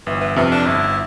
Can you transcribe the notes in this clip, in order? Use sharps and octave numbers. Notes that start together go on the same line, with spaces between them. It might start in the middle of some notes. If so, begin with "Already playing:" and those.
G1 E3
E3
F2 C3 E3
D4
G1 E4